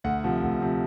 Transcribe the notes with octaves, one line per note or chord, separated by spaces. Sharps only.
D2 F#5
C3 F3
D2
C3 F3